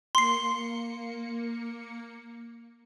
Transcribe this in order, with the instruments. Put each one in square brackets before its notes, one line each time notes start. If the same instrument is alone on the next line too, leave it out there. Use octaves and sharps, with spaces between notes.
[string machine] A#3 C#7 [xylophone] C6 C7